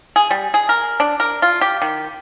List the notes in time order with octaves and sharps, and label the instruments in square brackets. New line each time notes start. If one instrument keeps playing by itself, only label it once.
[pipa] G#4
G3
G#4
A#4
D4
A#4
F4
G4
D#3